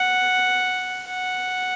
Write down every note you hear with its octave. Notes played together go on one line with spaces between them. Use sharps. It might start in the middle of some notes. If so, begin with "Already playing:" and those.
Already playing: F#5
F#5